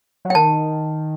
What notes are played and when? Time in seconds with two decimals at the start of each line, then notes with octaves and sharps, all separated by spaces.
0.25 F#3
0.30 G5
0.35 D#3 A5